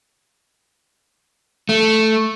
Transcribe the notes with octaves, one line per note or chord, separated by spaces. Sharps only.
A3